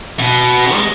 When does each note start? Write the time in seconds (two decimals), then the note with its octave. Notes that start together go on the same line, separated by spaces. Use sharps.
0.20 B2
0.73 G#3